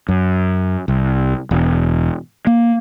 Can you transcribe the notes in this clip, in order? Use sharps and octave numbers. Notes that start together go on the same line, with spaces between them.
F#2
C2
E1
A#3